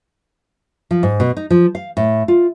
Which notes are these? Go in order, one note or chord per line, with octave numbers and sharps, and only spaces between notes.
F3
G#2
B2
D#4
F3
F5
A2
F4